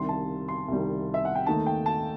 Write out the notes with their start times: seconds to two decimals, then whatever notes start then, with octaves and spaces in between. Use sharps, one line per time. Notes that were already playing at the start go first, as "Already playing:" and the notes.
Already playing: C2 C3 D#3 G3 C6
0.09 A5
0.48 C6
0.68 C2 C3 D#3 G3
1.14 E5
1.25 F#5
1.35 G5
1.46 D#2 D#3 A3 D#4 A5
1.66 G5
1.86 A5